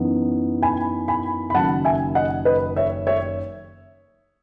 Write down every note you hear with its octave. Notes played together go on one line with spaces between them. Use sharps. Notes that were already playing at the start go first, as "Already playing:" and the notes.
Already playing: F#2 E3 B3 D#4
G#5 B5
G#5 B5
B5
F#1 F#2 D#3 F#3 F#5 A5
E5 G#5
D#5 F#5
B4 D#5
C#5 E5
C#5 E5